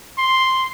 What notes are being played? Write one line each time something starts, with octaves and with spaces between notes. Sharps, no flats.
C6